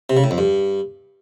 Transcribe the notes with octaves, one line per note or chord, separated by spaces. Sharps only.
C3
C#3
A2
F2
G2